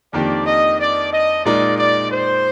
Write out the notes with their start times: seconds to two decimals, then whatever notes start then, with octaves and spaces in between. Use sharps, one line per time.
0.13 F2 D#3 A#3 D4 G4 D5
0.47 D#5
0.79 D5
1.13 D#5
1.45 A#2 G#3 D#4 A#4 D5
1.79 D5
2.12 C5